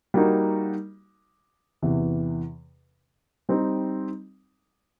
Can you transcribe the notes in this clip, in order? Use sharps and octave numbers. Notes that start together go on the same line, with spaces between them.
G3 A#3 D#4 F#4
E2 C3 E3
G3 C4 D#4